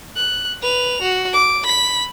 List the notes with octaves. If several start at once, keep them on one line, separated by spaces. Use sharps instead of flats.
F#6
B4 F7
F#4
D6
B5 B6